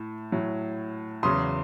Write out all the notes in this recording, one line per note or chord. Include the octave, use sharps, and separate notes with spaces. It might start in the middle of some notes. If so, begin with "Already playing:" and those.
Already playing: A2
A2 F#3
E2 C#3 F#3 C6 D#6